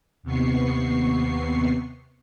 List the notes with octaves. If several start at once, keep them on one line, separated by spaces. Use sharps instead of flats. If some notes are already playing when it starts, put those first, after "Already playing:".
D#2 C3 B3 C#6 C7